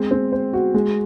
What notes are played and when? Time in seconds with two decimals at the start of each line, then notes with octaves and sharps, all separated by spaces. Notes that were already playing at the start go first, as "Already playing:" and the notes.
Already playing: G#3 C4
0.11 C4
0.32 C5
0.53 F#4
0.74 G#3